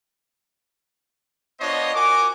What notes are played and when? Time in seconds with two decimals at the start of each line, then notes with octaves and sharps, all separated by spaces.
1.61 B3 D4 F4 C5 C#5 D#5
1.94 F#4 A#4 G#5 D6